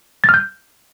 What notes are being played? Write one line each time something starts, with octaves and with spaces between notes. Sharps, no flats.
A6
F6
G6